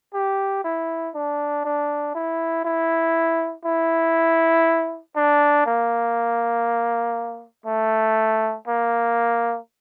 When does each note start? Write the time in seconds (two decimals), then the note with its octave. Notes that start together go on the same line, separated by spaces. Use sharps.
0.14 G4
0.64 E4
1.15 D4
1.65 D4
2.15 E4
2.65 E4
3.65 E4
5.16 D4
5.66 A#3
7.66 A3
8.67 A#3